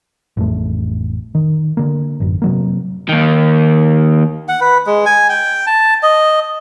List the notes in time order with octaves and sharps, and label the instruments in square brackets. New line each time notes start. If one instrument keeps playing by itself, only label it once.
[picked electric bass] A1 F2 A3
D#3
D3 A#3
A1 F#2
C3 F#3 A#3
[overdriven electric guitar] D#2 D#3
[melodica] F#5
B4
G#3
G#5
G5
A5
D#5